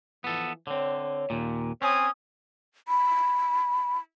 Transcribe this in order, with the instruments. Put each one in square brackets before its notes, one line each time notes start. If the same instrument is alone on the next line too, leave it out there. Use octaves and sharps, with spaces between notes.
[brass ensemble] E3 F3 E4 [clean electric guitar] B3 A4
[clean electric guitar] D3 C4 [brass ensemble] C#5
[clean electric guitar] D#2 A#2
[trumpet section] C4 G#5 D#6 [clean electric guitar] C#4 [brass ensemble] C#5
[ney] B5